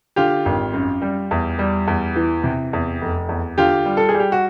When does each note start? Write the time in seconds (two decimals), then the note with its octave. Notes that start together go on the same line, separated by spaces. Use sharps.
0.16 D3 F4 G4
0.46 G#1
0.74 F#2
1.02 G3
1.31 E2
1.59 G3
1.88 E2
2.16 E3
2.44 C3
2.73 E2
3.01 F1
3.29 E2
3.58 D3 F4 G4
3.86 G3
3.97 A4
4.09 G#4
4.14 G3
4.20 G4
4.32 F#4